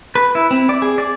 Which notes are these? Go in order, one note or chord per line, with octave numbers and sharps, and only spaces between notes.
B4
E4
C4
D5
G#4
D5